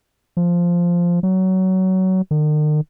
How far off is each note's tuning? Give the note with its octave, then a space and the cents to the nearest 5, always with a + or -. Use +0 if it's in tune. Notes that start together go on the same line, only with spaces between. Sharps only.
F3 -5
F#3 +20
D#3 -45